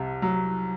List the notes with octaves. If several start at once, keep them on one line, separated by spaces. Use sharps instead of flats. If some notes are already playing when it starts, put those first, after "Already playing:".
Already playing: C2 C3
F#3